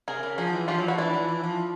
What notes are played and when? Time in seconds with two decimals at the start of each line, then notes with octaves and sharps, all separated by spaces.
0.08 C3 G#4 A#4
0.23 C#3
0.38 F3 F#4 G#4
0.53 E3
0.68 F3 F4 G4
0.78 F#3
0.88 F3 E4 F#4
0.98 E3 D4 E4
1.13 E3
1.28 E3
1.43 F3